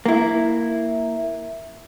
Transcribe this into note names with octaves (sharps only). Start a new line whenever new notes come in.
A#3 E4